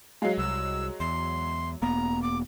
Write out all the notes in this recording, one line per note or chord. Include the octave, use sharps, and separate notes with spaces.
F#3 G#3 F5
C2 E6
E2 C6
E1 A#3 B3 A#5
D6